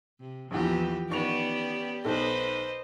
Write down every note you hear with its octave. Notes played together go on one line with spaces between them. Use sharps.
C3
A#1 E2 E3 F3 G4
D#3 B3 C#4 G4 D5 C#6 F7
B1 D#4 A4 B4 C5 D#5